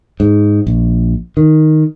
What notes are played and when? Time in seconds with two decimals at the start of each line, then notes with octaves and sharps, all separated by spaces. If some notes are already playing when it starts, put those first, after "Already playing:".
0.20 G#2
0.67 A#1
1.37 D#3